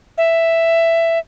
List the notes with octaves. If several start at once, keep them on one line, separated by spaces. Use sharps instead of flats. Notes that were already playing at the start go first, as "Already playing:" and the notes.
E5